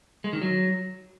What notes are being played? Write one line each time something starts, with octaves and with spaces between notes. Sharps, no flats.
G#3
D#3
F#3